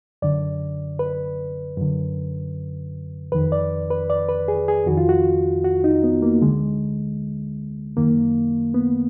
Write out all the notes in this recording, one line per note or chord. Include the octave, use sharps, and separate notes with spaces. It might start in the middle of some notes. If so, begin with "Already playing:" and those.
F#2 D3 D5
B4
F#2 D3
F2 D#3 B4
D5
B4
D5
B4
G#4
G#4
F2 D#3 F#4
F4
F#4
F#4
D#4
B3
A#3
D2 D3 G#3
F#2 D#3 A#3
B3